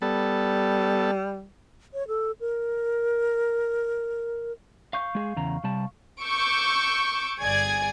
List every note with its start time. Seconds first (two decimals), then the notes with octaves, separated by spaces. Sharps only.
0.02 G3 B3 A4
1.94 C#5
2.08 A4
2.40 A#4
4.93 F5 C#6 G6
5.15 G#3 G#4
5.36 E2 C#3 A#5
5.64 C3 G3 A5
6.22 C#6 D6 E6 G6
7.40 G1 G#4 D5 G#5 G#6